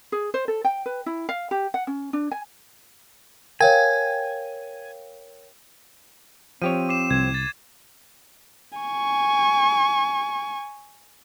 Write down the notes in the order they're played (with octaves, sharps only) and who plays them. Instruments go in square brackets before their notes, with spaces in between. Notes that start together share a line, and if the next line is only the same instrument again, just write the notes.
[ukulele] G#4
C5
A4
G5
B4
E4
F5
G4
F#5
C#4
D4
G#5
[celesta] A#4 C#5 [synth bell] F5 G5 [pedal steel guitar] G#5
[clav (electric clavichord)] F3 G4 C#5 [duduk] C4 [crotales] D#7
[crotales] D6 C7 E7
[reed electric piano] C2 [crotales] G#6 E7
[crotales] A6
[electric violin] G#5 C#6